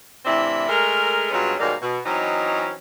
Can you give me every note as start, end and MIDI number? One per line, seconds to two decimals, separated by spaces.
0.25 0.67 45
0.25 0.67 48
0.25 0.67 52
0.25 0.67 60
0.25 0.67 62
0.25 0.67 64
0.69 1.28 56
0.69 1.28 57
0.69 1.28 70
1.31 1.53 43
1.31 1.53 54
1.31 1.53 56
1.31 1.53 59
1.31 1.53 61
1.31 1.53 65
1.59 1.74 44
1.59 1.74 47
1.59 1.74 51
1.59 1.74 54
1.59 1.74 55
1.59 1.74 58
1.81 1.98 47
2.04 2.71 52
2.04 2.71 54
2.04 2.71 60
2.04 2.71 61
2.04 2.71 63